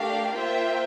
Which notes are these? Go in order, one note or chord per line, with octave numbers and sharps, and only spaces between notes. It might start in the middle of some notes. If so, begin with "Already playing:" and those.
Already playing: A3 D4 G4 A#4 F5
A#3 F4 C5 E5 G5